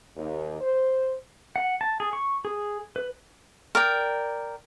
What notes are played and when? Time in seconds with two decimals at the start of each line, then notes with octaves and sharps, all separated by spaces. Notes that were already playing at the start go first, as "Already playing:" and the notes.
0.16 D#2
0.61 C5
1.56 F#5
1.81 A5
2.00 G#4
2.13 C#6
2.45 G#4
2.96 B4
3.75 A#4 D5 G5